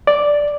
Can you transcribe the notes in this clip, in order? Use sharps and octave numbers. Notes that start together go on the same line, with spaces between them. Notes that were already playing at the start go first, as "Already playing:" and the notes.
D5